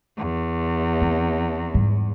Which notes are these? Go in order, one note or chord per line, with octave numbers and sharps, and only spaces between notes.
E2
C4
G#2 G3